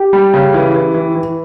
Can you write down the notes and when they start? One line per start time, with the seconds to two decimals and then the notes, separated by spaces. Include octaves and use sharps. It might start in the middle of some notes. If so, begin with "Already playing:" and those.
Already playing: G4
0.13 G3
0.34 C#3
0.54 E3
0.74 E3
0.94 E3
1.15 E3